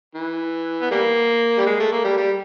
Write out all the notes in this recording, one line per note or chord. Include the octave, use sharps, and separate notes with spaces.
E3
B3
G3 A#3
G3
G#3
A3
A#3
G3
G3